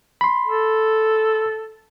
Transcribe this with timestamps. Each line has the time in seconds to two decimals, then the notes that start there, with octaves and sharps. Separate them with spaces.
0.21 B5 C6
0.46 A4